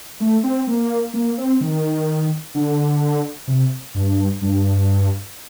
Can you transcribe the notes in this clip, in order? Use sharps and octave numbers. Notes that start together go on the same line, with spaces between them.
A3
C4
A#3
A#3
C4
D#3
D3
C3
G2
G2